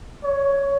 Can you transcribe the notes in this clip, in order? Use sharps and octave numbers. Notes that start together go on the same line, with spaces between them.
C#5